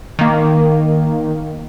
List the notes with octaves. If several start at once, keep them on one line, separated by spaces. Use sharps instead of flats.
D#3 A#3